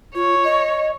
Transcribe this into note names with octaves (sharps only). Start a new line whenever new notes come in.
F4 C#5
D#5